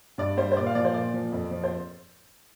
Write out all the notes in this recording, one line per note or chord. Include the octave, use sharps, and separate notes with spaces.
G2 D5
G3 C5
C5
A#2 D5
F5
F3 D5
C5
A#2 D5
F3
F2
F3
C5